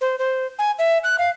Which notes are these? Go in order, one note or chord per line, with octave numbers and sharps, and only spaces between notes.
C5
C5
G#5
E5
F#6
F5